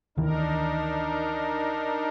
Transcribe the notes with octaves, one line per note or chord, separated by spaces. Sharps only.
D2 D#3 E3 D4 D#4 A#4